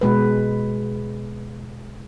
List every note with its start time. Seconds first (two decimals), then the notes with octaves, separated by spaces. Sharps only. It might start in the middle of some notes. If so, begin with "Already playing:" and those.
0.01 B2 G#3 B4